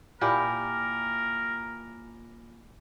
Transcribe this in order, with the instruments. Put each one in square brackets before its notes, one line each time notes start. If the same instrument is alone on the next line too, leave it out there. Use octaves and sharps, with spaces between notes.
[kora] A#2 E4 G4 [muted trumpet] A#4 [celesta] G#5 B5 D6